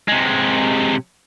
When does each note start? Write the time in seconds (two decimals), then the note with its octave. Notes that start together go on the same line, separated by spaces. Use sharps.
0.08 C3 G#3